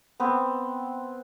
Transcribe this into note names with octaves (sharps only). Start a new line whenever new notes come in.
B3 C4